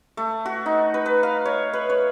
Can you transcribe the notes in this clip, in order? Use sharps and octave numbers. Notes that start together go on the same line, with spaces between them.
A3
F#4
D#4
B4
B4
F5
C#5
B4
C#5